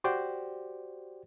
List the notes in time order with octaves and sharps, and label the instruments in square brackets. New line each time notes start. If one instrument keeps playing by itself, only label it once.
[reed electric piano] F#4 G4 C5 D5 G5